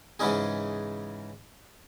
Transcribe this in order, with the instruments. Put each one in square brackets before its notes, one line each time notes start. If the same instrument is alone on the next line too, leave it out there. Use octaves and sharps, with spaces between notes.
[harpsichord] G#2 C#3 E3 C#4 D#4 G#4